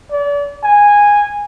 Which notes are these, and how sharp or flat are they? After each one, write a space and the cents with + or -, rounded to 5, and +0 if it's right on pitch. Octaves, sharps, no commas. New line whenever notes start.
D5 -35
G#5 -10